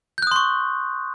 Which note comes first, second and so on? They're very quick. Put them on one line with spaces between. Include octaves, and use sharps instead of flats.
G6 F#6 D#6 C6 C#6